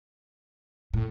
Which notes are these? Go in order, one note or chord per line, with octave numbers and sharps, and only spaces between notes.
A2